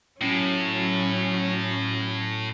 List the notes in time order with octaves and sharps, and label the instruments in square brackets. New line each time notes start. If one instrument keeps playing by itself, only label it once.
[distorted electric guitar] A2 [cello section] F#3 C#4